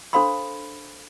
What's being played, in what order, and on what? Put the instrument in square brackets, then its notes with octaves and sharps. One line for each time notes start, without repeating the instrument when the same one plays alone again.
[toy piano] D4 A4 C5 F5 B5 C6